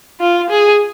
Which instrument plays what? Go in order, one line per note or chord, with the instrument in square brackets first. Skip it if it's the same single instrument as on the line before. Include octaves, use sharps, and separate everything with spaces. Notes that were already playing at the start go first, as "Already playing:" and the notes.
[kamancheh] F4
G#4